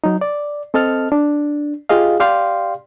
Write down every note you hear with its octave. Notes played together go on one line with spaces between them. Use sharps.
F#3 D#4
D5
C4 A4 D#5 A5 F6
D4
F4 G4 G#4 D#5 F5
G4 D5 F5 G5 C6